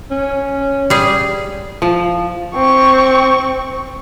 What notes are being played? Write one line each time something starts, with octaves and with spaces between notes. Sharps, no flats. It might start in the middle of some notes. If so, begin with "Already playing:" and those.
C#4
G3 G#4
F3
C4 C#6